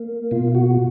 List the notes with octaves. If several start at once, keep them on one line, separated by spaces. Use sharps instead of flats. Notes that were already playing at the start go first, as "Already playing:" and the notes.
Already playing: A#3
B2 F4
F#4